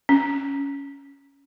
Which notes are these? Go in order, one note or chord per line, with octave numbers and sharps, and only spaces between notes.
C#4